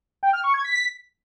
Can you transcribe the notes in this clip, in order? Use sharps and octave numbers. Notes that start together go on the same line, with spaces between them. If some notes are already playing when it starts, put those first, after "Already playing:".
G5
F6
C#6
G#6
B6